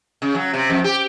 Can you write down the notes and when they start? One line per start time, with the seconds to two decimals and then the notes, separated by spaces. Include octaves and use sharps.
0.22 C#3
0.35 F#3
0.53 C3
0.70 F2
0.84 G4